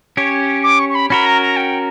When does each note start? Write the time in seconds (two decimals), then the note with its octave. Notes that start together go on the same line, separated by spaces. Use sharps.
0.17 C#4 G4 C#5
0.63 D6
0.79 C#6
0.89 C#6
0.95 B5
1.10 C#4 F#4 A#4 B5
1.26 A#5
1.42 A#5
1.56 G5